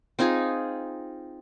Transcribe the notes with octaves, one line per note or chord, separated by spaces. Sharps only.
C4 D#4 F4 G#4